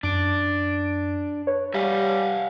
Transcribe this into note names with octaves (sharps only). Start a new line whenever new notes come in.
F#2 D4 D7
B4 C#5
G3 E5 F5 G#5